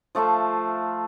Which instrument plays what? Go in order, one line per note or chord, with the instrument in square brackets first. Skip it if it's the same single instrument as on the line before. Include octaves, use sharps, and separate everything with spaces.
[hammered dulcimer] F3 A3 F4 E5